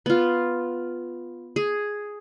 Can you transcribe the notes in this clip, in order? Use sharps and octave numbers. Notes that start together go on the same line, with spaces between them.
B3 F4
G#4